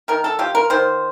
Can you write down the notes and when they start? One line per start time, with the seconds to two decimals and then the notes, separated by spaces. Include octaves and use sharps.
0.08 D#3 A#4
0.24 A4
0.39 F4 G4
0.55 A#4
0.70 D#3 C5